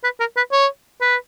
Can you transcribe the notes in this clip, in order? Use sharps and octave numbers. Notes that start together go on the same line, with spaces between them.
B4
A#4
B4
C#5
B4